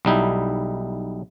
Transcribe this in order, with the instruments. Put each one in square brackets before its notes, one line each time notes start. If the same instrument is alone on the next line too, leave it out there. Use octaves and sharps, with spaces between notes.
[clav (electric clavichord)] B1 G3 D#4 E4